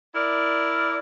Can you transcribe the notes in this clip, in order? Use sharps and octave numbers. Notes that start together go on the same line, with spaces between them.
E4 A#4 D5